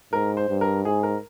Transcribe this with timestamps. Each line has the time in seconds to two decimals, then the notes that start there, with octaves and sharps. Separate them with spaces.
0.12 G#2 A#4
0.37 C5
0.49 G2
0.61 A#4
0.85 G#2 G#4
1.03 A#4